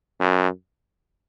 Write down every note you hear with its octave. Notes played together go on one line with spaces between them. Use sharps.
F#2